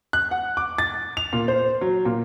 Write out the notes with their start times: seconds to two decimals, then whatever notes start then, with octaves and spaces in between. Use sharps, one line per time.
0.13 F#6
0.31 F#5
0.57 D6
0.78 A6
1.17 F7
1.33 A#2
1.48 C5
1.81 F#3
2.05 A#2